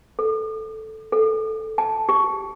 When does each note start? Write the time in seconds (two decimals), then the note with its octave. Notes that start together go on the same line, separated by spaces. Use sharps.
0.19 A4
1.12 A4
1.78 A5
2.09 G4